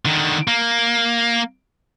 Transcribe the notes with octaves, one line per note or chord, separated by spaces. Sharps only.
D3 D#3
A#3